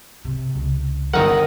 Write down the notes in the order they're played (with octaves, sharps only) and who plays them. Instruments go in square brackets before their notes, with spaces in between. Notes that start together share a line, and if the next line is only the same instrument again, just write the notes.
[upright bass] C3
C#2
[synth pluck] G1 D#3 F#5 [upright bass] F3 C#4 [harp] A#4 D#5